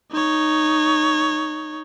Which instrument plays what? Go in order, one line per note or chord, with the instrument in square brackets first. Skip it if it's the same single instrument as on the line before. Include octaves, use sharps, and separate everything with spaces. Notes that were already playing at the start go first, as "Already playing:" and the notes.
[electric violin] D#4 C#5